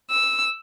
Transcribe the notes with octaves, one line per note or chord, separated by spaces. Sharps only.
E6